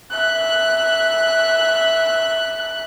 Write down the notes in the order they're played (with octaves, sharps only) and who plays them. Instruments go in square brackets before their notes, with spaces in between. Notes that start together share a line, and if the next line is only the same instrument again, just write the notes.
[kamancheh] E5 F#6